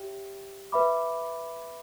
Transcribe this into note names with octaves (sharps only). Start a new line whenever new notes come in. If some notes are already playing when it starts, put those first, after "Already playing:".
Already playing: G4 C#5 E5 G5
B4 E5 B5 D6